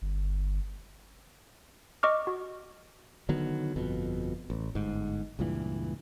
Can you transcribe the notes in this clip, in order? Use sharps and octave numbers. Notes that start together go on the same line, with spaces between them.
G1
D#5 C#6 D6 F6
F#4
D3 D#3 F#3 B3
G1 F2 B2
A1
G1 G#2
C#2 G2 A#2 E3